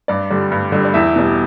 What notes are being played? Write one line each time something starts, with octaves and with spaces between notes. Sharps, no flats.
G2 D5
D3 G3
G2
D3 G3
D5
E2 E5
B2 G3